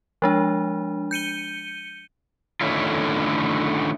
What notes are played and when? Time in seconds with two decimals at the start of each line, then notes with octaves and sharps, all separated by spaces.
0.22 F3 G#3 D4
1.11 G6 C#7 D#7 G7
2.61 D3 D#3 A3 C#4 E4 F4